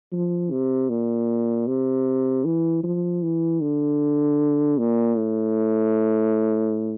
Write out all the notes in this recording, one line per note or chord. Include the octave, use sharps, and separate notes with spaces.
F3
C3
A#2
C3
E3
F3
E3
D3
A#2
A2